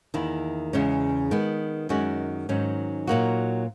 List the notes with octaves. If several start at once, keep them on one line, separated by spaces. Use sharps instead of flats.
E2 D#3 A#3 E4
E2 C#3 G#3 C#4
D#3 G#3 B3
F#2 D#3 G#3 C#4 F#4
G#2 D#3 F#3 C#4
A#2 F#3 A#3 D#4 F#4